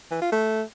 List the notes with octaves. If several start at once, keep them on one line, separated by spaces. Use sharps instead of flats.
E3
F4
A3